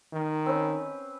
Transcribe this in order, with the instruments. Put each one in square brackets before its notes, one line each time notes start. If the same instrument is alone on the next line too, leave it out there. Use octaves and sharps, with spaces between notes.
[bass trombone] D#3
[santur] C4 C#4 B4